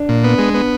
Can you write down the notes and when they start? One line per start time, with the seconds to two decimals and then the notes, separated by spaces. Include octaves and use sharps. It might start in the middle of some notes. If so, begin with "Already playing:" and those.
Already playing: D4
0.09 A#2
0.24 B3
0.39 G#3
0.54 B3